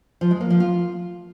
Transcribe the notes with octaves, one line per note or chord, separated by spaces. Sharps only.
F3
G#3
A#3
F3
F4